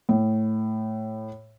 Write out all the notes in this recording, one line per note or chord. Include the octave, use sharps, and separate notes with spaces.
A2